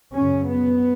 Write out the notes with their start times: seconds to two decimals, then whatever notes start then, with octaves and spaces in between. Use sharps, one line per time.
0.14 F#2 C#3 C#4
0.47 B3